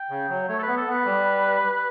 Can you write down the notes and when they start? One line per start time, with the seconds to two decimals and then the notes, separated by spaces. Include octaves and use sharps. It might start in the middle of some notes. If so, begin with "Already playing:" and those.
Already playing: G5
0.10 C#3
0.29 F#3
0.48 A3 C#5
0.59 A4
0.63 B3 B4
0.77 A4
0.86 B3 B4
1.05 G3